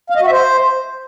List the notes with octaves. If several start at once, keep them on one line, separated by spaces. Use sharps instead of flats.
F5
D#5
F#4
E5
C5